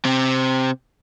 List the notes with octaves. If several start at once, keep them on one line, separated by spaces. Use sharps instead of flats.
C3 C4